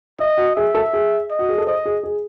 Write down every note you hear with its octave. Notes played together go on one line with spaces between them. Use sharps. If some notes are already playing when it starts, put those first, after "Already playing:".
D#5 E5
F#4
G#4 E5
A4
G#4
D#5
F#4
G#4
A4
C5 D#5
G#4
G#4